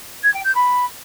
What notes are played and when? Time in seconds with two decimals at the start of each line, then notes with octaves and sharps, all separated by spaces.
0.23 G#6
0.34 G5
0.44 G6
0.55 B5